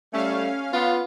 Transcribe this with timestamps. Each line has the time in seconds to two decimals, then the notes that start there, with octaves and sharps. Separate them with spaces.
0.13 G3 A3 C#4 F5
0.72 B3 F4